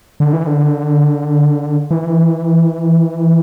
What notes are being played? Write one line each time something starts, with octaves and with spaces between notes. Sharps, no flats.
D3
E3
D3
E3